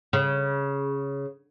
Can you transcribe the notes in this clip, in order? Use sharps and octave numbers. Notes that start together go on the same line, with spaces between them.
C#3